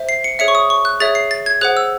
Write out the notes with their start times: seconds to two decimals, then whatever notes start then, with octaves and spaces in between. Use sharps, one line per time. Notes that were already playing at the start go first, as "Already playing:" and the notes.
Already playing: C5 E5
0.09 C7
0.24 C#7
0.39 G#4 C#5 E5 C#7
0.48 C#6
0.55 D#6
0.70 C#6
0.85 F#6
1.00 G#4 C#5 E5 A6
1.15 C7
1.31 A6
1.46 G#6
1.61 G#4 C5 F#5 F#6
1.77 E6